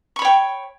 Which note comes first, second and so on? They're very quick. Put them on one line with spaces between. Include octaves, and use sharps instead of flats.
C#6 B5 C#5 G5